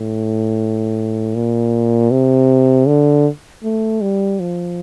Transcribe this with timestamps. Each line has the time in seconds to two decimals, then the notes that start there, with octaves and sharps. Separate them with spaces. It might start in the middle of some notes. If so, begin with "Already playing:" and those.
Already playing: A2
1.35 A#2
2.11 C3
2.87 D3
3.64 A3
4.01 G3
4.40 F3